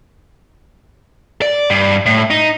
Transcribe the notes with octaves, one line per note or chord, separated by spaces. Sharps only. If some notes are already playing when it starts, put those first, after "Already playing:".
D5
G2
A2
D#4